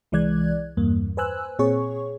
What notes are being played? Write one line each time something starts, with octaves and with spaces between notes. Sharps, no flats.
C2 E3 G#3 D5 F#6 G#6
E2 G2 A#3
B4 C5 G#5 E6 F#6
A#2 C4 G#4 C#5 C#6